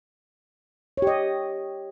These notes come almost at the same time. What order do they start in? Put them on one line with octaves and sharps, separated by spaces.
C#5 G4 D#5